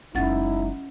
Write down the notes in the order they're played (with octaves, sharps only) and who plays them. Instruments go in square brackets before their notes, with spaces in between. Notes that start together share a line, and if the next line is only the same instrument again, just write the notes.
[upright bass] F#1 G#3 [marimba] C#4 F#5 A6 [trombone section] D#4 E4